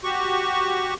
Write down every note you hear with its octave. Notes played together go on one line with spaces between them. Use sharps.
F#4 G4 C#6